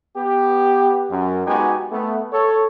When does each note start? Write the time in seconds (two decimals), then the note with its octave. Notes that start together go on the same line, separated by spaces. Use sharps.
0.16 B3 G4
1.10 F#2
1.47 G#3 B3 D#4 F#4 G4 G#5
1.92 A3 B3
2.33 A4 C#5